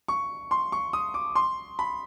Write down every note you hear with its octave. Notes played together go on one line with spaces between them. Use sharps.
C#6
C6
C#6
D#6
D6
C6
B5